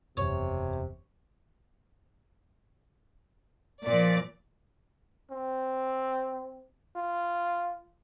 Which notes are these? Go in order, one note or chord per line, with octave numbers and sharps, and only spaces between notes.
F#1 E2 C3 C#5
A#2 F3 D5
C4
F4